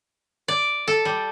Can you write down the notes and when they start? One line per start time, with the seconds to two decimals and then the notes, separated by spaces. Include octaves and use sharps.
0.48 D5
0.88 A4
1.05 G3